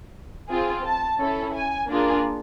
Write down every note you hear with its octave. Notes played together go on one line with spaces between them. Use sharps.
C4 F4 G#4
A5
C#4 E4 A4
G#5
A#3 D4 F4 G#4